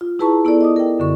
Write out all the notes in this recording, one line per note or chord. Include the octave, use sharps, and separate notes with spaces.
F4
E4 G#4 B4 A5 A#5 C#6
B3 E4 A4 D5
D#5 D6 D#6
A#4 G5
F#2 D3 C#6